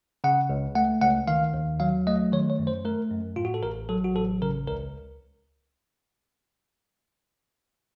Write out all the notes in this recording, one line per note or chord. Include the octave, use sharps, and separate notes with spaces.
C#3 F#5
C#2
A3 F#5
C#2 F#5
D#3 F5
D#2
F#3 F5
A3 D#5
D#3 C#5
C#5
F#2
C5
A3 A#4
F#2
A2 F4
F#4
A4
A1 A#4
F#3 A4
F#4
A1 A4
C#3 A#4
C#2 A#4